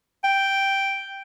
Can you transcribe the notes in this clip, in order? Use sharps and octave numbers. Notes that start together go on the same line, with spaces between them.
G5